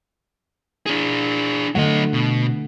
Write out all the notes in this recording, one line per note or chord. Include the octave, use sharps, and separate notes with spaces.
D4 E4 G#4
D3 F#3 A3 D#5 F#5
B2